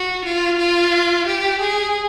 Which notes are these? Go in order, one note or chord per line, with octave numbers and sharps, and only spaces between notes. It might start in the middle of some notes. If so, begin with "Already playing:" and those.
Already playing: F#4
F4
F4
G4
G#4